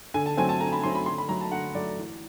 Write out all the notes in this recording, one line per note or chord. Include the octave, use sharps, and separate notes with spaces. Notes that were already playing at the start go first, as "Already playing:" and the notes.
D3 G#5
A5
F#3 A3 C4 G#5
A5
D3 A#5
B5
F#3 A3 C4 C6
B5
D3 C6
B5
F#3 A3 A#5
A5
D3 F#5
F#3 A3 D5
E3